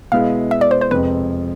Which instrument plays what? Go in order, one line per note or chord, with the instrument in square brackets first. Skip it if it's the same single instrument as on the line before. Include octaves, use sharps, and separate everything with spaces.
[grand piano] B2 G#3 B3 E4 [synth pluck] F5
[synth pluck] E5
D5
C5
C5
[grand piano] F2 C3 G#3 C4 [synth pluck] B4